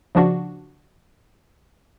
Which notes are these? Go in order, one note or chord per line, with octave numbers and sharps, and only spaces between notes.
C#3 F3 D4 F#4